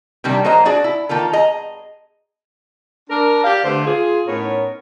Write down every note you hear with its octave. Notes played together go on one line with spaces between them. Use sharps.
C3 D#3 G3 A#3 D4
F#3 A#3 C5 D#5 A#5
D4 F#4 G#4 D5
E4
D#3 A#3 F4 A4
G#4 D#5 A#5
D4 A#4
G4 D5 F5
D3 A3 G4 B4 C5
F4 G#4
A2 B3 C#4 D#4 A#4 C#5